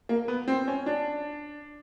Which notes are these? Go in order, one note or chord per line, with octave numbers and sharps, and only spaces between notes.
A#3
B3
C4
C#4
D4